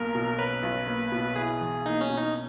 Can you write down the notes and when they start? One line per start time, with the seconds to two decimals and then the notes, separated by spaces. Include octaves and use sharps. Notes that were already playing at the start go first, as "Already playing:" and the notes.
Already playing: B1 B2 A#3 A#4
0.15 B2
0.38 C#4 B4
0.63 B1
0.87 A#3
1.12 B2
1.36 E4 G#4
1.61 E2
1.85 A#3 D#4
2.01 C#4
2.10 B2
2.17 D#4